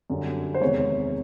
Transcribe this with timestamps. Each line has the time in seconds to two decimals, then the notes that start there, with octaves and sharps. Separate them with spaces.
0.10 F#2 D3 G3
0.54 C5
0.61 E2 C3 D#3 G#3 C#5